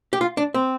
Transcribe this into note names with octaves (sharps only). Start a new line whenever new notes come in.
G4
F4
D4
C4